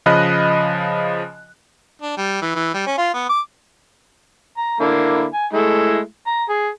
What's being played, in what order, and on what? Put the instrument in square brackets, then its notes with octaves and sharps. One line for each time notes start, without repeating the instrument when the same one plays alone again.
[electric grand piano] C#3 F3 D#5 B5 F#6
[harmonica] D4
G3
E3
E3
G3
C#4
F4
B3
D6
A#5
D3 A#3 E4
G#5
G#3 A3 E4
A#5
G#4